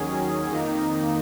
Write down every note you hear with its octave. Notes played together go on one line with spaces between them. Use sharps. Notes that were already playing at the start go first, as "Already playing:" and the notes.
Already playing: D#2 D#3 F#3 C#4 G#4
F2 D#3 A#3 D#4